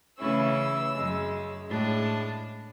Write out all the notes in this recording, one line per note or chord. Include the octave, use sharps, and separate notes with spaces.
C#3 E3 A3 C#4 E4 E6
F#2 C#3 G#3
A2 G#3 D4 A5